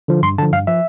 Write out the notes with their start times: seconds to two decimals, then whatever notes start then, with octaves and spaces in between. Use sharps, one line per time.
0.08 D3 F3
0.22 G2 C6
0.38 D3 A5
0.42 F3
0.52 G2 F5
0.67 F3 E5